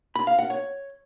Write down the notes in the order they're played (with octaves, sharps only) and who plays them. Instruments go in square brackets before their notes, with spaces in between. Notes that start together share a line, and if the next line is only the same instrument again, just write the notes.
[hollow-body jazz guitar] B5
F5
F#5
C#5